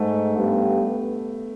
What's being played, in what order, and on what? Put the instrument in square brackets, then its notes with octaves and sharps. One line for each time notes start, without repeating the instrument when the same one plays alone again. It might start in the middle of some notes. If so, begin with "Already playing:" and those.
Already playing: [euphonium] G#2 [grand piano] A3
[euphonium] G2 [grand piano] B3